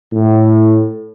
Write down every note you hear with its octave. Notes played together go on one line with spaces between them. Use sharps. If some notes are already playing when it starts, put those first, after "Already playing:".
A2